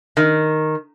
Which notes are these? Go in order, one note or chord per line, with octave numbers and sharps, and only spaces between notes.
D#3